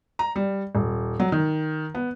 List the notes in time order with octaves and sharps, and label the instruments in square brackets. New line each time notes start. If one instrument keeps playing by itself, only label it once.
[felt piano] A#5
G3
D#1
F#3
D#3
B3